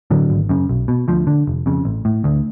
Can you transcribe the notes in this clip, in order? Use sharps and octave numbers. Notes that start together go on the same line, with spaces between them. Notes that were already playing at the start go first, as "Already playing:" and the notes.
A2 D3 F#3
G#1
F#2 C#3
B1
B2
D2 F3
D3
F1
F2 C#3
A1
A2
D2